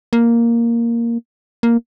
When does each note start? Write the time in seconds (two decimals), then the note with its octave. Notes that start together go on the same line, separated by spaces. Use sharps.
0.13 A#3
1.63 A#3